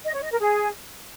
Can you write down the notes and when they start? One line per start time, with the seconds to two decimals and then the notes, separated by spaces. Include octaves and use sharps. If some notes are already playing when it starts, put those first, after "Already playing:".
0.04 D#5
0.13 C#5
0.22 D#5
0.31 A#4
0.40 G#4